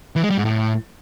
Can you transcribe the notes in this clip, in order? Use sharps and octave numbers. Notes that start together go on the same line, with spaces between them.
E3
G#3
G3
G#2
A2